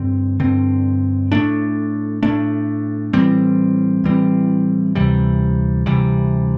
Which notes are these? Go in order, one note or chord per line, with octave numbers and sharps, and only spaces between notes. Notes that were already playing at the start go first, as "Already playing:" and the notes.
Already playing: G2 D3 C4
G2 D3 C4
A2 A3 D4
A2 A3 D4
A2 E3 G3 C4
A2 E3 G3 C4
D2 C3 E3 G3
D2 C3 E3 G3